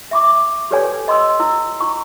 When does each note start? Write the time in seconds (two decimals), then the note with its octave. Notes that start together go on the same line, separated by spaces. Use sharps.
0.11 E5 C#6 D6
0.71 G4 A4 B4 C#5 D5 G#5
1.08 D#5 C6 D#6 E6
1.40 E4 E6
1.80 E4 C#6